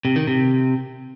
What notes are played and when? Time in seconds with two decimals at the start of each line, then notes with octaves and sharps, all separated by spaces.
0.05 C3
0.16 D#3
0.27 C3